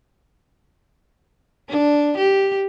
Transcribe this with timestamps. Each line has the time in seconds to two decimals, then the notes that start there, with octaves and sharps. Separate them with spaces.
1.69 D4
2.18 G4